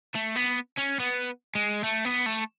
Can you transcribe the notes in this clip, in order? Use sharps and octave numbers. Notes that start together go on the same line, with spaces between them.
A3
B3
C#4
B3
G#3
A3
B3
A3